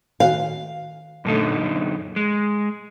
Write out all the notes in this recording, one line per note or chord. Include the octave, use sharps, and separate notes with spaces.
D#3 F#4 F5 G#5
F#2 A#2 D3 A3 D#4 A4
G#3